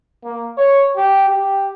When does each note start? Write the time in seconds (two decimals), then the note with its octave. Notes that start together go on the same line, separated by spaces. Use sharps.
0.24 A#3
0.58 C#5
0.96 G4
1.28 G4